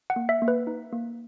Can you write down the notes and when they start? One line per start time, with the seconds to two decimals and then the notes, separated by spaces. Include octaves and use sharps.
0.10 F#5
0.16 A#3
0.29 E5
0.42 A#3
0.48 B4
0.67 D#4
0.93 A#3